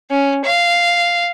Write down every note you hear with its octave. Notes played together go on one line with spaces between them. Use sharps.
C#4
F5